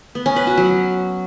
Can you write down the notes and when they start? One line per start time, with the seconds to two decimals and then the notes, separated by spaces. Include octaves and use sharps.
0.15 B3
0.26 C#4
0.36 B4
0.47 F#4
0.57 F#3